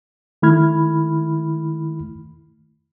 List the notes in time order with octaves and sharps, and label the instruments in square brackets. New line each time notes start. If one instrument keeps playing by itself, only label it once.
[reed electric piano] D#3 A3 E4 B5 F6 G#6